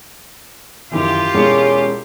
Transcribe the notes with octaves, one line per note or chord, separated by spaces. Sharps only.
F#2 D#3 E3 F4 G4
E1 G#3 C#4 C#7